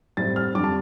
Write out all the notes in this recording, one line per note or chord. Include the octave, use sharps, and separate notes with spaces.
A2 G3 C4 A6
F6
F2 D3 G3 D4 D6
A5